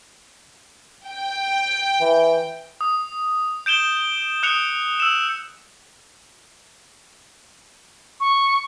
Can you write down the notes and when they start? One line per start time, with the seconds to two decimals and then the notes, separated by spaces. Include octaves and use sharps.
1.07 G5
2.01 E3
2.81 D#6
3.66 G6 D7 E7 G7
4.43 D#6 F#6 C#7 F7
5.00 E6 E7
8.20 C#6